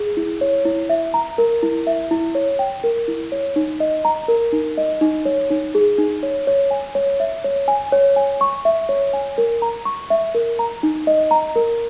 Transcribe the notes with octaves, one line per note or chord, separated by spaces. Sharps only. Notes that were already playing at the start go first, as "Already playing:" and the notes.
Already playing: G#4
E4
C#5
E4
E5
A#5
A#4
E4
E5
E4
C#5
G5
A#4
E4
C#5
D#4
D#5
A#5
A#4
D#4
D#5
D#4
C#5
D#4
G#4
D#4
C#5
C#5
G#5
C#5
E5
C#5
G#5
C#5
G#5
C#6
E5
C#5
G#5
A#4
A#5
C#6
E5
A#4
A#5
D#4
D#5
A#5
A#4